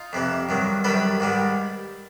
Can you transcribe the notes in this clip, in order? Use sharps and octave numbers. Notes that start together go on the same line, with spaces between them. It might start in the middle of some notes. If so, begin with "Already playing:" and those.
Already playing: D#4 F4
F2 C3 E3
G2 D#3 F#3
F#2 D#3 G3 A4 B4
G#2 D#3 G3